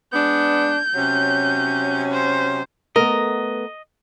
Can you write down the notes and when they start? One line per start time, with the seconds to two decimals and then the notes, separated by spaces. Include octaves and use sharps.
0.13 G#3 B3 D4 G6
0.94 C3 F#3 C#4
2.11 C5
2.96 A3 B3 A#4 D#5